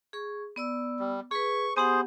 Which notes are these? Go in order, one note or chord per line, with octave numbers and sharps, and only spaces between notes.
G#4 C#6
B3 D5 E6
G3
G#4 B4 C#6
B3 G4 G#4 C5 F#5